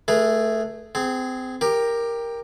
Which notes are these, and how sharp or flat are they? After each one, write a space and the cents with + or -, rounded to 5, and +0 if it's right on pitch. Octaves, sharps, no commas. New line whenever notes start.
A3 +0 G#4 +0 B4 -40
C4 -30 G#4 +0
G4 +15 A#4 +0